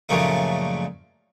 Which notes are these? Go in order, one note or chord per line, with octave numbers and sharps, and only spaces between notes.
F#2 A#2 C#3 F3 A3 D#4